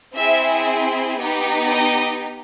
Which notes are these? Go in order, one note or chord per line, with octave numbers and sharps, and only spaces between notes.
C4 E4 G#4 E5
B3 D#4 G4
D#5